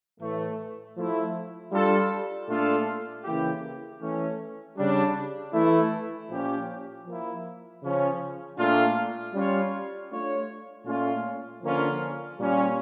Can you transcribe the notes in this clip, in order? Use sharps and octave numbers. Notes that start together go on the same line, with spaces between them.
A2 E3 A3
F3 A3 E4
G3 D4 F4 A4
A#2 A3 D4 F4 A4
C#3 E3 A#3 E4 G4
E3 A3 C#4
C#3 G3 D4
E3 A3 E4
A#2 F3 C#4 G4
F3 A#3 E4
C#3 F3 C#4
A#2 A3 D4 F4
G3 C#4 F4 C#5
A3 D4 F4 C#5
A#2 A3 C#4 F4
D3 F3 A#3 C#4 F4
A#2 G3 C#4 F4